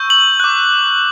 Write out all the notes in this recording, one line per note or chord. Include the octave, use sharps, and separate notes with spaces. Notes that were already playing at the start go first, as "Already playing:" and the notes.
Already playing: C#6 E6 G6
F#7
D6 F#6